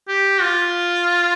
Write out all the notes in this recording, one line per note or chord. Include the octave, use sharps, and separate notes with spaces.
G4
F4